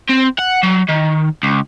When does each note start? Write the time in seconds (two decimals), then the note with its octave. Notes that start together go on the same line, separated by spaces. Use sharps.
0.09 C4
0.38 F#5
0.63 F#3
0.88 D#3
1.43 C#2